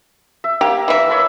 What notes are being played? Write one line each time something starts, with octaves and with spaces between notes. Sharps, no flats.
E5
A#3 G4
E3 E5
C#5 B5 E6